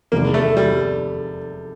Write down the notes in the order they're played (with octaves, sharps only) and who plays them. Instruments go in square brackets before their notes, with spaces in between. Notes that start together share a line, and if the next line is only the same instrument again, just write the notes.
[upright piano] F1 E2 C3 D#3 G#3 [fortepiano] A#3
[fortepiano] A3
G3